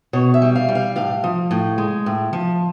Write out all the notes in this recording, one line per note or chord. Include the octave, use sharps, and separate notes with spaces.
B2 C#5
E5
G3
F5
G3
F5
A2 F5
F3
A2
G#3
A2
F3